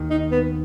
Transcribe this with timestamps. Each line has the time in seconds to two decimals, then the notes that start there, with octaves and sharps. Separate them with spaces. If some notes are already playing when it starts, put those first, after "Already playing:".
Already playing: D#2 D#3
0.10 D#4
0.32 B3